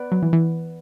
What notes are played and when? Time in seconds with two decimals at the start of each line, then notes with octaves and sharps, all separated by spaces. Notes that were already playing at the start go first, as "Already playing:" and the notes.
Already playing: B3 B4 D5
0.12 F#3
0.22 E3
0.33 E3